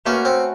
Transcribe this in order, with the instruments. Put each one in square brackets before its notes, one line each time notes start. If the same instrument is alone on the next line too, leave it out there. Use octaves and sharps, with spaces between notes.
[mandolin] A3 C#4 F#4 B4 [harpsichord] A#3
[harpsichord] C4